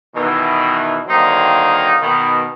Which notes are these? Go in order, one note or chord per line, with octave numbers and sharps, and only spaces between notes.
B2 D#3 E3
D3 D#3 F#3 A#3 C4 D#4
B2 D#3